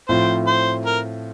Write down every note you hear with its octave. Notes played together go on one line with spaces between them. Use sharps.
A2 F3 C4 F4 C5
C5
A#4